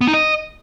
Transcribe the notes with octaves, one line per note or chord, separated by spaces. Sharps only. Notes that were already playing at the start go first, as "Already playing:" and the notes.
B3
D#4
D#5